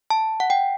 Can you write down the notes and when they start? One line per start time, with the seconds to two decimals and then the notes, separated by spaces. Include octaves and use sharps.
0.10 A5
0.40 F#5
0.50 G5